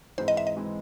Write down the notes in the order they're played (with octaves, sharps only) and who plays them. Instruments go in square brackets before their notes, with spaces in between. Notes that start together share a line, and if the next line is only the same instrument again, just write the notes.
[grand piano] G#2 E3 G#3 C4 [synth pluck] C5
[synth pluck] D#5
E5
D#5
[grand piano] E3 G#3 C4